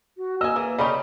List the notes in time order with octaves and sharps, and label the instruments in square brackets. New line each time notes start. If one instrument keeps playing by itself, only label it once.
[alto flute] F#4
[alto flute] A#3 [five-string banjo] D#5 G#5 [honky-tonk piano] E6
[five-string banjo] E3 [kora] G#4
[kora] C#3 C#4 D#4 [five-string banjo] G4 D5 D#5 [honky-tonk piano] B5